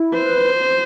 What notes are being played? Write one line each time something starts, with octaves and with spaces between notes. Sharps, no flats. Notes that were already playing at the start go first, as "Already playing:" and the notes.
Already playing: E4
B4 C5